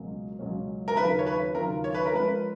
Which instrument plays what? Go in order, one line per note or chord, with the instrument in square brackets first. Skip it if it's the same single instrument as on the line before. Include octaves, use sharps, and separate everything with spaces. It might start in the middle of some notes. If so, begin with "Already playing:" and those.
Already playing: [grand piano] C#2 B2 F#3 A#3 C#4
C#2 B2 F#3 A#3 C#4
[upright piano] A#4
[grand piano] D#2 C#3 F#3 C#4 F4 [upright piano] B4
[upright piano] C#5
B4
[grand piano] D#2 C#3 F#3 C#4 F4 [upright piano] A#4
[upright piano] C#5
B4
A#4
[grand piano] F3 G#3 C#4 F4 [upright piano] B4